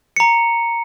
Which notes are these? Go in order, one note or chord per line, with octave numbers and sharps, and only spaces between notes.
A#5 C#7